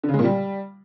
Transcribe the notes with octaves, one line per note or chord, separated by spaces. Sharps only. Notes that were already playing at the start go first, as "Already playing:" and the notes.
D3
C#3
G#3
A#2
G3